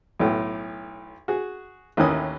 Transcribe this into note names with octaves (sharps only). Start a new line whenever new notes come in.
B1 A2
F#4 G#4
A1 D#2 D#3 E3 C#4 D#6